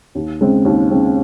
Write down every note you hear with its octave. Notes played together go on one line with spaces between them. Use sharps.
D#2
C#3 G#3 C4
D#2
C#3 G#3 C4